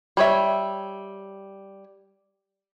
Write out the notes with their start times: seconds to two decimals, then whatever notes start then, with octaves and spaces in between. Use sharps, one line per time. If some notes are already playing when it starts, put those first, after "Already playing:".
0.17 G3 C#5 E5